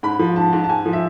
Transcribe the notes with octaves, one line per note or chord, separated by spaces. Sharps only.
G#2 B5
F3
G#2 A5
G#2
A5
G#2 G#5
F3
E5